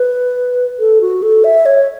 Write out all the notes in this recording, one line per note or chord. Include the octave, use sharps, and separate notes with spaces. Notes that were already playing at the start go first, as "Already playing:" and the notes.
Already playing: B4
A4
F#4
A4
E5
C#5